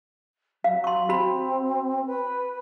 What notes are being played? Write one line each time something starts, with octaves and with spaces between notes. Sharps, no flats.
F#3 F5
C6 C#6
C4 F#4 B5
B4